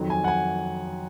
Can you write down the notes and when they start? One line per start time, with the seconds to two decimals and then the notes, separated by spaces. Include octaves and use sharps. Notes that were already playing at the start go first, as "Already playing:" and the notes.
Already playing: F2 D#3 F#3
0.10 G#5
0.24 F#5
0.28 G#5